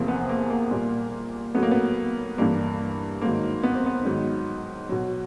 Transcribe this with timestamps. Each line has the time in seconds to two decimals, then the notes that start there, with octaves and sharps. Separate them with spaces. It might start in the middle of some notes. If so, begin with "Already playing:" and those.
Already playing: E2 C3 F3 A#3
0.08 B3
0.29 A#3
0.50 A#3
0.71 A#2 G3
1.55 A2 F#3 B3
1.63 A#3
1.71 B3
2.38 G2 E3 G3 A#3
3.21 G#2 D#3 F#3 A#3
3.63 B3
3.75 C4
3.86 B3
4.05 G#2 D#3 F#3
4.89 B2 F#3